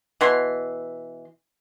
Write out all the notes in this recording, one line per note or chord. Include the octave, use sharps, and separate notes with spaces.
B2 E3 C6